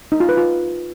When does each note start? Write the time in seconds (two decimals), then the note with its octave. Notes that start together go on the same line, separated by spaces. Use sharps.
0.12 D#4
0.20 F4
0.29 B4
0.37 F4